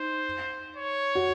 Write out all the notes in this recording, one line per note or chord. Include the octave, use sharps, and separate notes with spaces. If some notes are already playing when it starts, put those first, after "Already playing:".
Already playing: D#4 C5
C#5
F#4